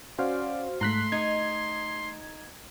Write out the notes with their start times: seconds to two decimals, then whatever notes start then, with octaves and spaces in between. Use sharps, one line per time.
0.19 C#4 F#4 C5 D5 F5
0.81 G#2 A3 A#5 C6 F#6 B6
1.12 D#4 G#6